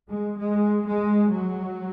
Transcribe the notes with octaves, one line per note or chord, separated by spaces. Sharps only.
G#3
G#3
G#3
F#3